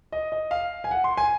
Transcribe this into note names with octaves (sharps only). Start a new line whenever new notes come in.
D#5
D#5
F5
G#5
F#5
C6
G#5